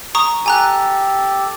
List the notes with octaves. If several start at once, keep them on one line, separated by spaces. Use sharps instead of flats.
A#5 C#6 D#6
G4 A4 G#5 A#5 F#6